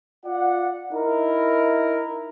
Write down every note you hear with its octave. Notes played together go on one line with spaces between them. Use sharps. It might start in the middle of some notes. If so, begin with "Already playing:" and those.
F4 D5 F#5
D#4 E4 A#4